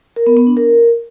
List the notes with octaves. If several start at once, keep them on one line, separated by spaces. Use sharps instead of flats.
A#4
B3
B3
D4
A#4